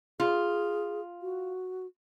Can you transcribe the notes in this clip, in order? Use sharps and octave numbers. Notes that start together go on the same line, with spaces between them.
F4 G#4
F#4